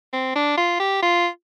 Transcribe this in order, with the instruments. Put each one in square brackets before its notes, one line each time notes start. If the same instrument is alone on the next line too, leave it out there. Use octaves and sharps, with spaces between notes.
[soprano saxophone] C4
D4
F4
G4
F4